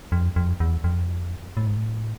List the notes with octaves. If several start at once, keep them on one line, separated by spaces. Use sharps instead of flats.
F2
F2
E2
F2
A2
G#2
A2